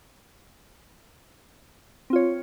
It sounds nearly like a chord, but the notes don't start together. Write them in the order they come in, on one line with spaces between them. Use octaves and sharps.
C4 F4 C#5